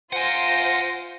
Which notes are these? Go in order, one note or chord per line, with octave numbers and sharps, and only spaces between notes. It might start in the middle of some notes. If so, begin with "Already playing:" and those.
F4 C5 F#5 G#5 A#6 D#7